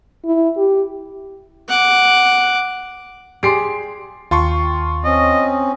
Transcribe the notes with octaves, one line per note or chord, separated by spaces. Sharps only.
E4
G4
F#5 D6
G4 G#4 D5 C6 C7 D7
D#2 F4 G5 A5 C6 C#6
C4 C#4 D#5